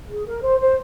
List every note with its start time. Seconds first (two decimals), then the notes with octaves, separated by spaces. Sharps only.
0.10 G#4
0.26 A#4
0.42 C5
0.60 C5